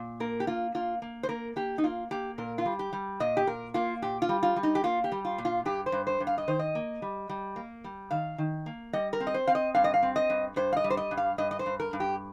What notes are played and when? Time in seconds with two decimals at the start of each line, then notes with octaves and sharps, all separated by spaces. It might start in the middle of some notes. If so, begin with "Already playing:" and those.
Already playing: A#2
0.20 A#3 A#4
0.40 G4
0.47 A#3 F4
0.75 A#3 F4
1.02 A#3
1.23 C5
1.29 A#3 A#4
1.56 A#3 G4
1.78 D#4
1.84 A#3 F4
2.11 A#3 G4
2.38 A#2 A#4
2.58 F4
2.65 G3
2.79 G4
2.93 G3
3.20 A#2 D#5
3.37 G4
3.47 A#2 A#4
3.74 A#3 F4
4.02 A#2 G4
4.22 F4
4.29 G3
4.43 F4
4.56 G3
4.63 D#4
4.75 G4
4.84 A#3 F4
5.04 G4
5.12 G3
5.25 F4
5.38 A#2
5.45 F4
5.65 G2 G4
5.86 C5
5.92 G2
6.07 C5
6.20 G2
6.27 F5
6.38 D#5
6.48 D#3 C5
6.59 D#5
6.75 A#3
7.02 G3
7.29 G3
7.56 A#3
7.84 G3
8.11 D#3 F5
8.38 D#3
8.66 A#3
8.93 G3 D#5
9.13 A#4
9.20 C4
9.27 D#5
9.34 C5
9.47 C4 F5
9.55 D#5
9.75 G2 F5
9.84 D#5
9.94 F5
10.03 C4
10.16 D#5
10.30 G2
10.56 G2 C5
10.73 F5
10.77 D#5
10.84 G3
10.90 C5
10.97 D#5
11.11 G2
11.17 F5
11.38 G2 D#5
11.51 D#5
11.59 C5
11.66 G2
11.80 A#4
11.93 G2
12.00 G4